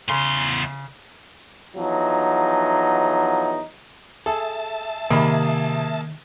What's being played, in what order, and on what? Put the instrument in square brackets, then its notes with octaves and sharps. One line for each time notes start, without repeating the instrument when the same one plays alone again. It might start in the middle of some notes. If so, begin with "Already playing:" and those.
[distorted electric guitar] E2 C6 [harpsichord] C#3
[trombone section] E2 F3 F#3 D#4
[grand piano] G#4 [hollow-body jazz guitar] A4 [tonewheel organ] E5 A5
[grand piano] C3 [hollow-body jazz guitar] D#3 B5 [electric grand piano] A#3 G#4